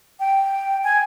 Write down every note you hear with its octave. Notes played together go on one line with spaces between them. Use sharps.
G5
G#5